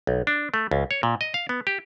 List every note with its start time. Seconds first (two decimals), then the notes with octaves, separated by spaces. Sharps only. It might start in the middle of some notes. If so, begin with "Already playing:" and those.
0.07 B1
0.27 D4
0.54 A3
0.71 C#2
0.91 C#5
1.03 A#2
1.21 D#5
1.34 F5
1.49 B3
1.67 G4